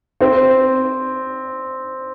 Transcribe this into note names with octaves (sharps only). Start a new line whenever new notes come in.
C4